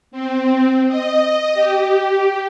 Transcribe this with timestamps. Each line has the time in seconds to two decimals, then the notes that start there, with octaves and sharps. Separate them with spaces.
0.12 C4
0.88 D#5
1.54 G4